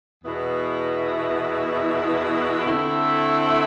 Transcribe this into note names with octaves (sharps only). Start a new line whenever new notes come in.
E2 B2 B3 E4
D3 A3 C4 E4